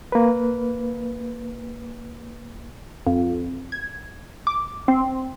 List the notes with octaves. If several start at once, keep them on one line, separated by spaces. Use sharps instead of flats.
A#3 B4
F2
G#6
D6
C4